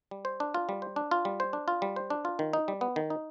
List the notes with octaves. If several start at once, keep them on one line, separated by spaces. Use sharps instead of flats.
G3
C5
D4
F4
G3
C5
D4
F4
G3
C5
D4
F4
G3
C5
D4
F4
D#3
D#4
G3
B3
D#3
D#4